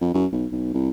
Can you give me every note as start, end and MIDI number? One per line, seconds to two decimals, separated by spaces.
0.01 0.11 41
0.14 0.26 42
0.32 0.46 35
0.52 0.70 35
0.74 0.90 36